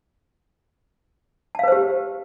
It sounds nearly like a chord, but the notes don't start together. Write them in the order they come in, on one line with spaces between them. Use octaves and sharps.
A5 F5 B4 C5 G4